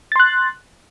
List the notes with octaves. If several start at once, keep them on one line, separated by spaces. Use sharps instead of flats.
C6 F#6 A6